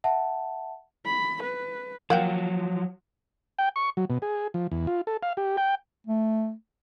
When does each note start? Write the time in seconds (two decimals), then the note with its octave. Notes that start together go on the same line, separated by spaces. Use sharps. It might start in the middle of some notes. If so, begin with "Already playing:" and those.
0.04 E5 F#5 A5
1.06 B5
1.43 B4
2.10 F3 F#3 A#3 F#5 G5
3.59 G5
3.76 C#6
3.97 F#3
4.10 B2
4.22 G#4
4.54 F3
4.72 E2
4.87 F4
5.07 A4
5.23 F5
5.37 G4
5.57 G5
6.07 A3